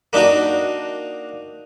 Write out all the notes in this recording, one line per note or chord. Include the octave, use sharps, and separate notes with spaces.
A#3 D4 D#4 F#4